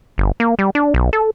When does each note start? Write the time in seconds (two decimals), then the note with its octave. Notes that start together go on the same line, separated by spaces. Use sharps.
0.18 G1
0.40 A#3
0.59 G3
0.75 D4
0.94 B1
1.13 A4